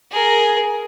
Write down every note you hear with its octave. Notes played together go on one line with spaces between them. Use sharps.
G#4 A#4